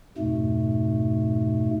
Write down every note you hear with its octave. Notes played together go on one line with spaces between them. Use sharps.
F2 G#2 B2 A3